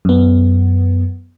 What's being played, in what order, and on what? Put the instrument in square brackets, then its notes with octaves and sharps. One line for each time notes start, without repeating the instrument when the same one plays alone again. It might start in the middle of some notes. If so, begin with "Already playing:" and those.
[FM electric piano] F#2 B3